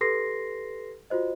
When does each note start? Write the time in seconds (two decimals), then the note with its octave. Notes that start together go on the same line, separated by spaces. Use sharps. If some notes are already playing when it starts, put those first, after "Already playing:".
0.01 G4 A4 B4 C6 A#6 C7
1.10 F4 F#4 C5 D#5